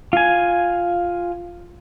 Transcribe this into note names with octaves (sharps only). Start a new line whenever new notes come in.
F4 G#5